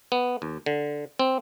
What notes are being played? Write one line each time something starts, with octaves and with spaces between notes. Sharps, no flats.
B3
D#2
D3
C4